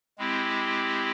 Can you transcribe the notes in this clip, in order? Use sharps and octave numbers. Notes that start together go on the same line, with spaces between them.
G#3 C4 E4 G4